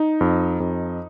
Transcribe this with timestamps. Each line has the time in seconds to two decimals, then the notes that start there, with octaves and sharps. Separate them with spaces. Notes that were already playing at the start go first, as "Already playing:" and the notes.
Already playing: D#4
0.21 F2
0.60 F2